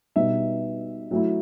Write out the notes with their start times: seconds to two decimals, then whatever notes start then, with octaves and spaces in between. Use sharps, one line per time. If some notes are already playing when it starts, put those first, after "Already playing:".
0.16 B2 G3 B3 D#4 E5
1.11 F#3 A3 E4